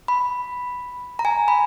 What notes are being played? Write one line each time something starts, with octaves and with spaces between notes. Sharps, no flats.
B5
A#5
G#5
B5